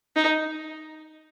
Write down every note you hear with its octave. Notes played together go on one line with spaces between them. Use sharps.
D#4